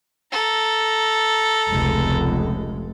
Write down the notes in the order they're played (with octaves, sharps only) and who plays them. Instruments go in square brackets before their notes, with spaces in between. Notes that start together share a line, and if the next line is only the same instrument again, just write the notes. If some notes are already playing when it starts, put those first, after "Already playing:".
[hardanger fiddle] A4 A#5
[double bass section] F1 C#2 G#3